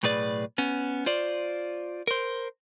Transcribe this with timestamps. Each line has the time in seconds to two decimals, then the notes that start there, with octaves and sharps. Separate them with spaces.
0.03 B1 A2 G#4 B4 D5
0.58 B3 C#4
1.06 F4 C5 D5
2.07 A#4 C5